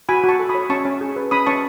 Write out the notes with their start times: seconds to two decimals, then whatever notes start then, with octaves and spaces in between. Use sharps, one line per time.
0.09 F#4 G#5 B5
0.24 F#4 A5 C#6
0.39 A4
0.49 B5 D#6
0.55 C#5
0.70 C#4 A5 C#6
0.85 C#4
1.01 G#4
1.16 B4
1.31 C#4 B5 D#6
1.46 C#4 A5 C#6